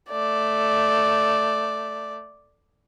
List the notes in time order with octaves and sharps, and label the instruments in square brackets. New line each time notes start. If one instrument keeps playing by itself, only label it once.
[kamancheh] A3 D5